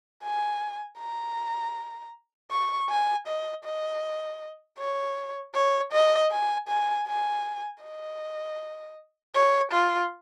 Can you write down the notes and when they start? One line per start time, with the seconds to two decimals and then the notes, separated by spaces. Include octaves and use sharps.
0.23 G#5
0.98 A#5
2.51 C#6
2.89 G#5
3.27 D#5
3.64 D#5
4.79 C#5
5.54 C#5
5.92 D#5
6.31 G#5
6.68 G#5
7.07 G#5
7.83 D#5
9.35 C#5
9.72 F4